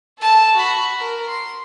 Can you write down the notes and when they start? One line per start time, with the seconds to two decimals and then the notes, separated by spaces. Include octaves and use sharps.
0.18 A4 A5
0.54 F#4 B5
0.99 A#4
1.28 C6